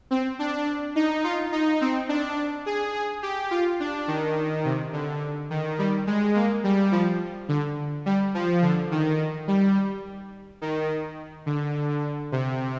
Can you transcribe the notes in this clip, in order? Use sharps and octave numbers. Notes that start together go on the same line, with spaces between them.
C4
D4
D#4
F4
D#4
C4
D4
G#4
G#4
G4
F4
D4
D#3
C3
D3
D#3
G3
G#3
A#3
G3
F3
D3
G3
F3
D3
D#3
G3
D#3
D3
C3